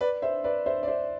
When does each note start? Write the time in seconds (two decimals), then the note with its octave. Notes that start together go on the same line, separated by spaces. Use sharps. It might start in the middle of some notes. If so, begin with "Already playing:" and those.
0.01 B4 D5
0.22 C5 E5
0.44 B4 D5
0.66 C5 E5
0.83 D5
0.88 C5 E5